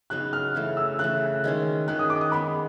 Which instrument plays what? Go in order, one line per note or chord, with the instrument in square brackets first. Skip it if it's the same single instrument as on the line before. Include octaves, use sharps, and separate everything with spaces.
[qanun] C#3 F#3 B3 D#4 [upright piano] F#6
[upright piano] F6
[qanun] C#3 E3 A3
[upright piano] E6
[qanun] C#3 E3 A3 [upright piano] F#6
[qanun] D#3 G#3 C#4
[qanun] D#3 G#3 C#4 [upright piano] F#6
[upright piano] D#6
D6
D#6
[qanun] G#3 B3 D#4 [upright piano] B5